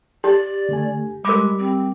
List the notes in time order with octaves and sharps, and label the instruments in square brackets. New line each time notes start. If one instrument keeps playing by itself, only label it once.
[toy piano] G4 [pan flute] D5
[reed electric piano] D3 A3 G#5
[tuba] G3 [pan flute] G#3 [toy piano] A#4 D6 [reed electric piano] B5
[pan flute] C4